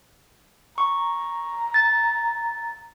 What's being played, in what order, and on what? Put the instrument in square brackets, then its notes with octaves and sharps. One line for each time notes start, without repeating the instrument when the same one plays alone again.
[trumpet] A#5 [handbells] C#6
[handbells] A6